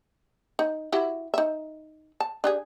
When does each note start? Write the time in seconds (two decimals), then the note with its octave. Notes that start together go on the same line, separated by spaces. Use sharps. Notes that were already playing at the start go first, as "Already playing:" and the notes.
0.59 D#4
0.92 E4 F#4 G4
1.34 D#4 E5
2.20 A5
2.44 D4 G4 G#4